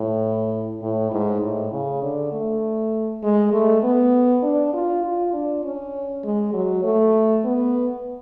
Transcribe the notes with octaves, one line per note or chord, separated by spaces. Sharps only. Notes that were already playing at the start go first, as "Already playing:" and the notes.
Already playing: A2
A2
G#2
A2
C#3
D3
A3
G#3
A3
B3
D4
F4
F4
D4
C#4
G#3
F#3
A3
B3